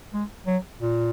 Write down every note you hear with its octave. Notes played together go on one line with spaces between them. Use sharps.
G#3
F#3
A#2